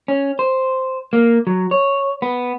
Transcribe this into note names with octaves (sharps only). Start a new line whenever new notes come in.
C#4
C5
A#3
F#3
C#5
B3